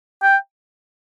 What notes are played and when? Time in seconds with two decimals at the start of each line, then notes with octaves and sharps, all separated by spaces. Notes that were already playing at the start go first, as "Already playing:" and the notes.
0.23 G5